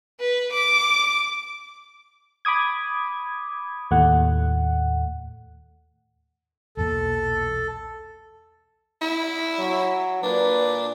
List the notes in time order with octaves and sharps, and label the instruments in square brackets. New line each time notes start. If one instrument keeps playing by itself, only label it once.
[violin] B4
D6
[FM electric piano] B5 D6 D#6 G#6
D#2 A2 A3 F#5
[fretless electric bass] B1 E2 A#2 [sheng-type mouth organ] A4
[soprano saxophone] E4
[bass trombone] F#3 [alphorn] C#5
[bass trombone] A#2 [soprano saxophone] D4 [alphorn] B4